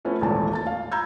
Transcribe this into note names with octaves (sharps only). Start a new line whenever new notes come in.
F3 A3 B3 C#4 E4
D#1 G#1 E2 E3 A5
A3 A5 A6
F5
A#5 B5 E6 G6 G#6